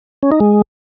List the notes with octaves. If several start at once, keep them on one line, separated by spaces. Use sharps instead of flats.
C#4
D#4
G#3